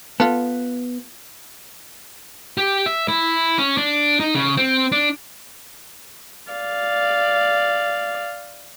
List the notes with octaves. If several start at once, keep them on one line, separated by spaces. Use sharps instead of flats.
B3 F4 A4
G4
E5
E4
C#4
D4
D#4
C#3
C4
D4
D5 F5